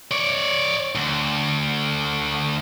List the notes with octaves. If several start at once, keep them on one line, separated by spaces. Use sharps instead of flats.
C#5 D5
D2